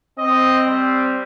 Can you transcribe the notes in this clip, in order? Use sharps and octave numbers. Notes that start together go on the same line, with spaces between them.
C4 D#5
G3